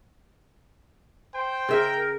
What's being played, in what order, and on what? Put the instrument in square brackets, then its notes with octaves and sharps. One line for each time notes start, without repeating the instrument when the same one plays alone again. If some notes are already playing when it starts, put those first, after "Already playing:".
[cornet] C5 [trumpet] G5
[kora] C#3 E5 [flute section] A#4